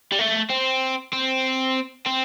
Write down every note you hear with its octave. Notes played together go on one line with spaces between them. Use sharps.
G3
A3
C4
C4
C4